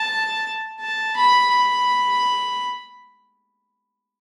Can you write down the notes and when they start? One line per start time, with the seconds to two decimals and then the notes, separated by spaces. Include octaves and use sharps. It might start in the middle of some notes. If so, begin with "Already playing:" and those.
Already playing: A5
0.80 A5
1.17 B5
1.51 B5